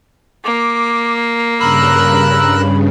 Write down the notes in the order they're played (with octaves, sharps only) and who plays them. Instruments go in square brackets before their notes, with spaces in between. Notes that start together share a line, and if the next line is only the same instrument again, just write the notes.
[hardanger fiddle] A#3 [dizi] D6
[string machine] G2 C#3 [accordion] A#4 E6 F#6 [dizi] B5